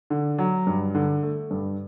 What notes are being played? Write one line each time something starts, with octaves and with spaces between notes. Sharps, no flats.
D3
F#3
G2
D3
A3
G2